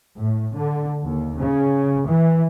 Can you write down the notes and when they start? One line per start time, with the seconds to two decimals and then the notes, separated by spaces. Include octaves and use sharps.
0.19 A2
0.55 D3
1.04 D#2
1.37 C#3
2.06 E3